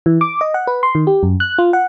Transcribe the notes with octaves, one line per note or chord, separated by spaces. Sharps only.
E3
D6
D#5
F#5
B4
C6
D#3
G4
F#2
F#6
F4
F#5